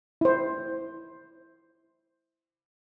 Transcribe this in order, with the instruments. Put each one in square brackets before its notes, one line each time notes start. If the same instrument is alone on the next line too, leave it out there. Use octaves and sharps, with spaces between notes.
[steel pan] E4 C5